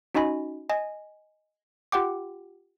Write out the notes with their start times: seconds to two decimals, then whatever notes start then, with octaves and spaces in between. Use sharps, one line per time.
0.15 C#4 D#4 F#4 D#5 G#5 B5
0.70 D#5 G#5
1.92 F4 G4 F#5 G5 D6